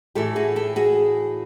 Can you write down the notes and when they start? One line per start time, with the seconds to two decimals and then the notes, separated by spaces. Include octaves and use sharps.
0.15 A2 E3 G4 A4
0.36 F#4 G#4
0.56 G4 A4
0.76 F#4 G#4